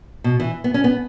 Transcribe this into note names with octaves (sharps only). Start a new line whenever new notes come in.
B2
E3
B3
C#4
B3